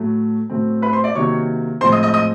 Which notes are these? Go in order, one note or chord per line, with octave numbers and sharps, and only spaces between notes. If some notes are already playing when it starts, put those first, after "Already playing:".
Already playing: A2 F#3 A3
A2 F#3 A3 C4
B4 B5
C5 C6
D5 D6
C3 D#3 F#3 A#3 C#5 C#6
A2 F3 G#3 C4 C5 C6
D#5 D#6
D#5 D#6
D#5 D#6